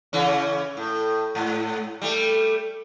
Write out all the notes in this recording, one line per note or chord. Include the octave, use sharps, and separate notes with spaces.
C#3 E3 C#4
A2
G#2
G3 A3